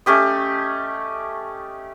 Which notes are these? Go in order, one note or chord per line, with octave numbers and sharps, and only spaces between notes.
A3 C#4 G4 D#5